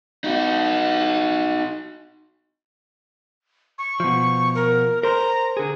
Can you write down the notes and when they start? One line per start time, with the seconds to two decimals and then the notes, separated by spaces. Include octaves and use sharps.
0.24 D#4 F#4
3.78 C#6
4.00 B2 F3
4.55 A#4
5.03 A#4 C5 A#5
5.57 D3 G#4